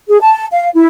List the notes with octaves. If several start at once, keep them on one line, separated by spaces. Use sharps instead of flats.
G#4
A5
F5
E4